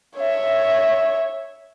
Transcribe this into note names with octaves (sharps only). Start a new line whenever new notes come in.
C#5 E5